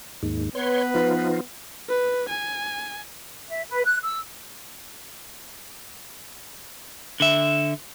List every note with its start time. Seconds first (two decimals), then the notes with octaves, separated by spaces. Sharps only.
0.23 D#2 G#2
0.55 B3 B4 C#5 C6
0.94 F3 D#4 F4
1.89 B4
2.29 G#5
3.49 E5
3.69 B4
3.85 F#6
4.04 E6
7.20 D3 E5